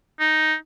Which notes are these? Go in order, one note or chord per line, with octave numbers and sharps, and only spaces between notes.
D#4